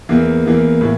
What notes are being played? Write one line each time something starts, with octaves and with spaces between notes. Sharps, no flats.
E2 E3 A#3
E2 E3 A#3
A2 E3